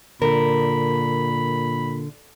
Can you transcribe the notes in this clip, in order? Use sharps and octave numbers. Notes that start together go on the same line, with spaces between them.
A#2 D3 A#4 B5